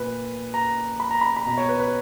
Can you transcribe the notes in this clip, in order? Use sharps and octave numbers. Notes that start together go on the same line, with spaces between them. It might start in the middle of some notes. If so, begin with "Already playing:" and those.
Already playing: A#2 B4
A#5
B5
A#5
B5
B5
B2 A#5
C#5
B4
B4